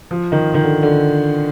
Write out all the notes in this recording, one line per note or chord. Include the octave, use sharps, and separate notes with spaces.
F3
D#3
D#3
D3
D3